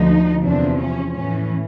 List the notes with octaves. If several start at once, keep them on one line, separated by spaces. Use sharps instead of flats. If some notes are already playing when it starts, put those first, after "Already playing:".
Already playing: D2 D3 F3 D#4
E2 C3 F3 D4
C#4
A2 E3 C#4